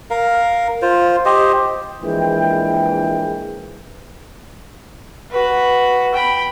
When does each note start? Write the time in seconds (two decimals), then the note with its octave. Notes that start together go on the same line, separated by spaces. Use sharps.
0.10 A#4 F5
0.82 F4 C5
1.25 G4 C5 D#5
2.01 A#1 E3 G#3 G5
5.32 F#4 B4
6.14 G5 B5